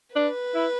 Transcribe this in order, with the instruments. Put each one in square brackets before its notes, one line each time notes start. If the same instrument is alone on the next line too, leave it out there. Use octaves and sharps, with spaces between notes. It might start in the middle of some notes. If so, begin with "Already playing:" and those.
[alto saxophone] D4 [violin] B4
[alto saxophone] E4